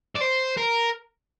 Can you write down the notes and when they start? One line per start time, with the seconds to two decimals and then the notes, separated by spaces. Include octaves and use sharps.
0.15 D5
0.21 C5
0.57 A#4